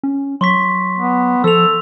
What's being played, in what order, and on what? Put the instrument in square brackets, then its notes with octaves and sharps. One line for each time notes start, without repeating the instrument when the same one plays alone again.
[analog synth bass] C#4
[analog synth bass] F#3 [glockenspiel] C6 C#6 B6
[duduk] B3
[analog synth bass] F3 [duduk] A4 [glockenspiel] E6 F7